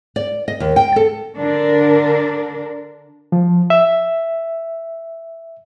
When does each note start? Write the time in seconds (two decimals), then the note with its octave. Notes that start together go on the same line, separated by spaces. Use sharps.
0.16 D5
0.48 D#5
0.60 D#2
0.76 G5
0.96 A4
1.39 D3 D4 A#4
3.32 F3
3.70 E5